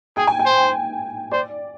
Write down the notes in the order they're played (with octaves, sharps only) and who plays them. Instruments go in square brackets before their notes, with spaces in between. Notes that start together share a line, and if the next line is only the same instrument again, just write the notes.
[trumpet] G#4 [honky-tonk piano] G5
[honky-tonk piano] G#5
G5
[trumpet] C5
[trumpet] C5 [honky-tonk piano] D5